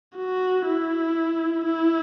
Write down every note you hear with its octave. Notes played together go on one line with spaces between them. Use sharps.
F#4
E4
E4